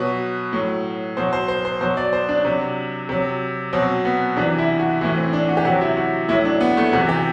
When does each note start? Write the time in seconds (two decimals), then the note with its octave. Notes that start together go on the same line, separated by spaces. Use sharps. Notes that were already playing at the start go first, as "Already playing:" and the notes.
Already playing: B2 F#3 B4
0.53 A2 F#3
1.17 B2 F#3 C5
1.33 C5
1.48 C5
1.65 C5
1.81 B2 F#3 C5
1.97 D5
2.13 C5
2.29 D4
2.45 C3 F#3
3.09 C3 F#3
3.73 B2 F#3 C4
4.05 B3
4.37 C3 E3 D4
4.58 E4
4.80 F#4
5.01 A2 E3 E4
5.17 C4
5.33 D4
5.49 F#4
5.57 G4
5.65 C3 F#3 F#4
5.81 E4
5.97 F#4
6.28 A2 E4
6.33 F#3
6.45 D4
6.61 B3
6.77 A3
6.93 C3 E3 F#4
7.09 G4